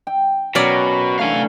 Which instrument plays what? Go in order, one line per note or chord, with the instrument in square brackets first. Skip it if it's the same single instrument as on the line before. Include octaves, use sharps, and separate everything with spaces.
[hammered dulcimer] G5
[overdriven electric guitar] B2 [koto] F#3 C#4 D5 [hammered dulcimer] A#4 C#5
[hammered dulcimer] D3 E3 A3 [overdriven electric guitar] F5 G#5